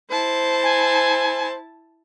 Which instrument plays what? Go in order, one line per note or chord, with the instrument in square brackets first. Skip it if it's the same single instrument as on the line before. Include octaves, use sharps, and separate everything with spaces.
[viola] E4 A5 [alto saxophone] C5
[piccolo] G#5